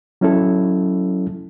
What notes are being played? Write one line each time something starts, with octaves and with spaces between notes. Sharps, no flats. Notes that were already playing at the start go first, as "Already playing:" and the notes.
F#3 C#4 E4 A4